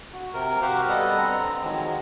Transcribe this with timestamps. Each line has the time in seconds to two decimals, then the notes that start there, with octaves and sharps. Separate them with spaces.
0.13 F#4
0.34 C3 A#4
0.62 F#4 G4 A#4 C5 F5 F#5
0.89 G3 B3 A4 D#5 F#5
1.18 D3 C4 A#5
1.63 D#3 F3 F#3 G#3